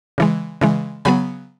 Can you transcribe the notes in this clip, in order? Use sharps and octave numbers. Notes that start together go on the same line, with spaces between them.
C#3 E3 G#3
C#3 E3 G#3
C#3 F#3 B3 G#5 B5